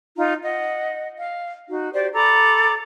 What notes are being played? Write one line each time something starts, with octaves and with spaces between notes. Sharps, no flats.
D#4 F4 A#5
D#5 F#5
F5
D#4 F#4
G4 C5 D5
A4 A#5 B5 D6